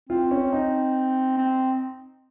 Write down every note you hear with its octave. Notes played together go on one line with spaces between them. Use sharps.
C4 F4
C#4
D#4
C4